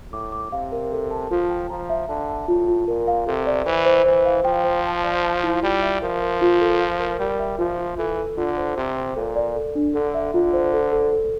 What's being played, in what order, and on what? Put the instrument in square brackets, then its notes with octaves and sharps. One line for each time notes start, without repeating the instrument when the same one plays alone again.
[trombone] A2 [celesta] D6
[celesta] D6
[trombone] C3 [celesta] F5
[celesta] A#4
A4
A5
[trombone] F3 [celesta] F4
[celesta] G5
[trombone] F3 [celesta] A#5
[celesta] E5
[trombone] D3 [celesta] A5
[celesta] A5
[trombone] A2 [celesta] F4
[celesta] F4
[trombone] A#2 [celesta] A#4
[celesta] F5
[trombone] C3 [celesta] A4
[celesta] D5
[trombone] E3 [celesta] C5
[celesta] C5
[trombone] E3 [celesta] C5
[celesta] F5
[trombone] F3 [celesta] G5
[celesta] C5
A5
D5
A5
E4
[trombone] G3 [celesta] F4
[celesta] E5
[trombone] F3 [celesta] A#4
[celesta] A#4
F4
A4
F5
A#4
[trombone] G3 [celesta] A#4
[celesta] E5
[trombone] F3 [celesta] F4
[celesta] F4
[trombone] E3 [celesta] A4
[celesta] A4
[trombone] D3 [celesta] F4
[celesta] C5
[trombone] C3 [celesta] C5
[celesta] C5
[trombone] A#2 [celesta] A4
[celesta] D5
A4
D4
[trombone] D3 [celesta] A4
[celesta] E5
[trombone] D3 [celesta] F4
[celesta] C5
A4
A4
A4